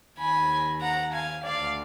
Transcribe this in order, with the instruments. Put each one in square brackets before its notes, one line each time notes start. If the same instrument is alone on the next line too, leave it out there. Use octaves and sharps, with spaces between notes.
[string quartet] D#2 D#3 G#5 B5
F#5 A#5
F5 G#5
D2 D3 D5 F5